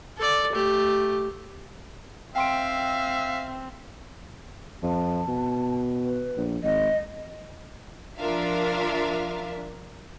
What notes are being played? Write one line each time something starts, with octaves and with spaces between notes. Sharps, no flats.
A4 D5
A3 G4
C4 E5 F5 G5 C6 D7
F2 A5
B2
B4
A#1
G#1 D#5
F3 D4 F4 A#4 E5 F5